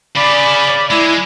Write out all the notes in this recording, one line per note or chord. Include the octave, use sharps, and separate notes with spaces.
C#3 D5 B5
G#3 E4